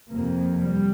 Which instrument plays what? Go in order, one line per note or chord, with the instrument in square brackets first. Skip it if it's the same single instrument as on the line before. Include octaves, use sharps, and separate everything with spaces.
[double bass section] F2 C3 A#3
G3